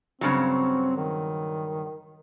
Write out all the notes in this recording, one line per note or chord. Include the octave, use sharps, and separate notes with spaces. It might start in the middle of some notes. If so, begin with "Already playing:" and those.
G2 C#3 F#3 C4
D#3